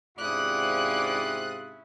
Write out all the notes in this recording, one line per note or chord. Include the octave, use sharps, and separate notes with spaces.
G#2 C3 C#4 E4 F4 D5 D#6 F#6